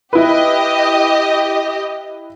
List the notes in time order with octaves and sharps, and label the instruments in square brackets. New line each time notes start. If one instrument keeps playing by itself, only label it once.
[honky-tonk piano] E4 B4 [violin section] G4 D#5